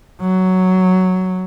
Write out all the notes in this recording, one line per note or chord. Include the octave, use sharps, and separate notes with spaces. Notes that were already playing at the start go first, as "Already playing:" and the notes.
F#3